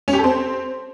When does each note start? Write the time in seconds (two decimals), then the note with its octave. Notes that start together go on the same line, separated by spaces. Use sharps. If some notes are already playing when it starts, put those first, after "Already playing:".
0.08 C#4
0.13 G4
0.18 A4
0.24 C4